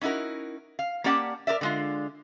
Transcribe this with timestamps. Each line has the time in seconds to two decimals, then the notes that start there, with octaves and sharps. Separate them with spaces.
0.01 C#4 D#4 E4 F#4 A#4
0.79 F5
1.04 A#3 C#4 G4 D5 F#5 A5
1.47 A#4 B4 D5 E5
1.61 D3 G#3 F4